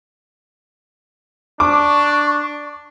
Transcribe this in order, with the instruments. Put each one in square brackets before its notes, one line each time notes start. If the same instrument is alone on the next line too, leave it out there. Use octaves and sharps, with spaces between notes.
[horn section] D4 [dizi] C#6 [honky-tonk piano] D6